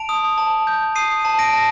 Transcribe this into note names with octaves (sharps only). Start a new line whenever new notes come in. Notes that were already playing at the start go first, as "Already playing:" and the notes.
Already playing: A5 D7 F7
D#6
A5
G6
D#6 C7 D#7
A5
A#6 D7
A5